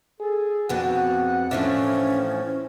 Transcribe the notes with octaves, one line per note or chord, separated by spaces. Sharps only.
G#4 A4
F2 B3 D4 F#4 F#5
A2 E3 F3 C#4 D4 E5